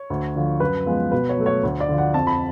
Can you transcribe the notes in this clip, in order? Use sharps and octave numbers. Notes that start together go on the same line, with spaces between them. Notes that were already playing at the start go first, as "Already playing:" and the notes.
Already playing: C#5
D2
D3 F3
F#2 B4
F3 G#3 B3
B2 B4
C#5
F#3 A3
C#5
D2
D5
D3 F3
F#5
F2 A5
B5